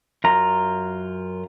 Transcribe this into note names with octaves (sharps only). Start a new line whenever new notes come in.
F#2 F4 A#5